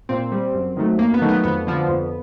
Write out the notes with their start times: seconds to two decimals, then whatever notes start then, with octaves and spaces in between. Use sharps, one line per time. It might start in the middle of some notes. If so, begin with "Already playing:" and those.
0.09 A#2 C4
0.32 G3
0.54 F#2
0.77 D#3 F#3 A3
0.99 F#2 A#3
1.14 B3
1.22 D#3 F#3 A3
1.29 B3
1.44 F2 B3
1.67 D3 F3
1.88 F2